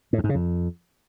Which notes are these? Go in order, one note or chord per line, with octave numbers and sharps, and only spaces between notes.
A2
F2
G#2
C#3
F2